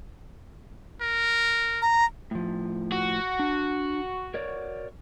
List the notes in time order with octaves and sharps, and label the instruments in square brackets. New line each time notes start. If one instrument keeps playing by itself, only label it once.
[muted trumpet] A#4
[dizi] A#5
[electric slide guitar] A2 F3
[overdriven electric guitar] F#4
[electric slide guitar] D4
A#4 C#5 D5